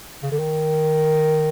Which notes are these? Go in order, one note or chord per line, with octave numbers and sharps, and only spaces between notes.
C#3
D3
D#3